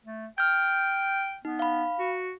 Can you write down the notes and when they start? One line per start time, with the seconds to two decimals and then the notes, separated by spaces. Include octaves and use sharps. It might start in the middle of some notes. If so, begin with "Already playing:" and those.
0.04 A3
0.38 G5 F6 G6
1.45 B3 D#4
1.59 F5 B5
1.99 F#4